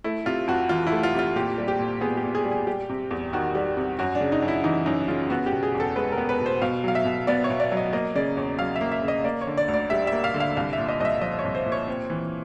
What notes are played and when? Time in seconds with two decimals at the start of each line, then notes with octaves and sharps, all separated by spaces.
0.04 A3 E4
0.26 C3 F4
0.47 F2 F#4
0.69 E3 F4
0.87 A3 E4
1.03 F4
1.14 C3 F4
1.36 A#2 G4
1.58 G3
1.68 G4
1.79 A#2
2.01 B3 G#4
2.17 G4
2.23 A#2
2.35 G#4
2.45 G3
2.51 G#4
2.67 G3 G4
2.89 C3
3.11 E2
3.33 D#3 F#4
3.55 G3
3.77 C3
3.99 F#2 F#4
4.15 D4
4.21 C#3
4.32 D#4
4.42 F#2
4.48 E4
4.64 E3 D#4
4.86 F#2 D#4
5.08 C#3 F4
5.30 B3 F#4
5.46 G4
5.51 B2
5.63 G#4
5.75 E2
5.80 A4
5.96 G#3 B4
6.12 A#4
6.18 B3
6.29 B4
6.40 B2
6.46 C5
6.62 B2 F5
6.84 F#3 F5
6.95 E5
7.05 B2
7.27 B3 D5
7.44 C#5
7.50 B2
7.60 D5
7.72 F#3
7.77 D#5
7.93 A#3 D#5
8.15 C#3 D5
8.36 E2 C#5
8.59 F#3 F5
8.76 E5
8.81 A#3
8.92 E5
9.03 C#3
9.08 D#5
9.24 A#3 D5
9.41 C#5
9.47 D3
9.57 D5
9.68 D2
9.74 D5
9.90 G3 E5
10.07 A#3 E5
10.24 F5
10.34 D3
10.40 F5
10.57 C2 F5
10.73 E5
10.78 A#2
10.88 D#5
11.00 C2 D#5
11.05 E5
11.22 F3 D#5
11.39 C#5
11.44 C2
11.55 C5
11.65 A#2
11.72 C#5
11.88 C4
12.10 E3